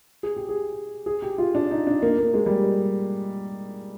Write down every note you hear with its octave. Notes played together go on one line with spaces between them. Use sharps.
G#4
G4
G#4
G#4
G4
F4
D4
D#4
D4
A#3
A#3
G#3
G3